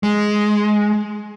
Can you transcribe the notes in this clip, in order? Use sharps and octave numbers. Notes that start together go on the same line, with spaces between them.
G#3